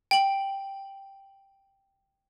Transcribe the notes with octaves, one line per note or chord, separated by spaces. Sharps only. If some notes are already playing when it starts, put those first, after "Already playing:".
G5 F#7